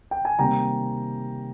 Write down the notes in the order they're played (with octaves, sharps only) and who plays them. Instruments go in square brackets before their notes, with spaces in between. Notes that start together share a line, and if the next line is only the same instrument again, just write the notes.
[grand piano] G5
G#5
C3 D#3 G3 A#3 G5 A#5